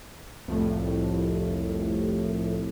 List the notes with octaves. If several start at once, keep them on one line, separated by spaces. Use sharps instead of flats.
C2 F2 A2